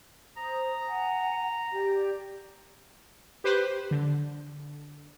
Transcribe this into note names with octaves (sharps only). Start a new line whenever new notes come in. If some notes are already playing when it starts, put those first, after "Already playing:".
C5 A#5 D#6
F#5 G#5
G4 D5
G4 B4 C5
D3